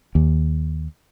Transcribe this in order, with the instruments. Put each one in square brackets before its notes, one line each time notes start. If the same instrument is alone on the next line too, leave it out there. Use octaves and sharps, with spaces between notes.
[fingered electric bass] D#2